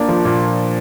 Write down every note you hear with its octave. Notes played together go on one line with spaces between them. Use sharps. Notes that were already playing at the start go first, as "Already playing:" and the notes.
Already playing: A#3 D4
F3
A#2